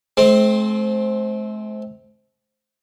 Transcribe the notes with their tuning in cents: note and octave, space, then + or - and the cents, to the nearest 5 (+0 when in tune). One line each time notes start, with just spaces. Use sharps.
A3 -45 C4 +5